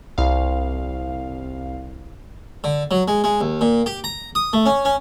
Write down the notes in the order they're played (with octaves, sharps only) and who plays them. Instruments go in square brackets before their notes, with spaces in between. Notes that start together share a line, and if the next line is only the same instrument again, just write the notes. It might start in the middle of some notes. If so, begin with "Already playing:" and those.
[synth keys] C2 F5
[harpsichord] D3
F#3
G#3
G#3
D#2
A#2
G4
A#5
D#6
A3
C#4
C#4